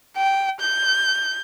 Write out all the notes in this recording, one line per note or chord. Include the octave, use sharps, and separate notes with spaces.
G5
G6